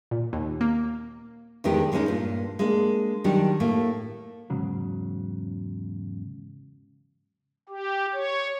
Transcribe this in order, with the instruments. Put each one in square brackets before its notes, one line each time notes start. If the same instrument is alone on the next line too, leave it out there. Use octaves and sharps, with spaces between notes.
[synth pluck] A#2
D#2
A#3
[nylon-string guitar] E2 A2 D#3 G#3 D4 G4
E3 G#3 B3 C#4 D#4
G2 A#2
G#3 A#3 D4
D#3 F#3 G3 D4 G4
A2 A3 A#3
[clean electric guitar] E2 G#2 C#3 F#3
[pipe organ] G4
C#5